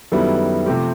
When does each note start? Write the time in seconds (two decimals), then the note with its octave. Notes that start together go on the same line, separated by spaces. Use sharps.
0.12 F#2 D#3 G3 B3 E4 A4
0.66 C3 F3 A3 C4 G4